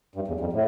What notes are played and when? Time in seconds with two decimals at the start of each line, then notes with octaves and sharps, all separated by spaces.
0.15 G2
0.28 E2
0.40 F2
0.53 A2